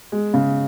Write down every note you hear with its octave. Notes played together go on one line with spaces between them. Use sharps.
G#3
C#3